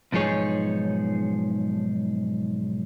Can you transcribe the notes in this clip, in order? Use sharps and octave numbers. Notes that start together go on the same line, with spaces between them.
B1 G#2 F3 D#4 G#4 C#5